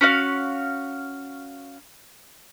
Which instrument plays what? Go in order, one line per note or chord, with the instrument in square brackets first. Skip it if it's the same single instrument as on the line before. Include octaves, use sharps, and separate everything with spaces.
[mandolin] C#4 F#4 F5